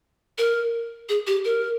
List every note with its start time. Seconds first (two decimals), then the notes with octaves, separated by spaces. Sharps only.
0.38 A#4
1.09 G#4
1.27 G4
1.45 A#4